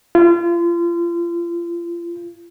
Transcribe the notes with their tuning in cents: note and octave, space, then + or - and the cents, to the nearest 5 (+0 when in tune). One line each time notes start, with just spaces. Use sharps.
F4 -35